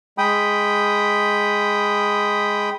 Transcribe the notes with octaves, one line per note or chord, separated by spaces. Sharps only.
G#3 G5 B5 D#6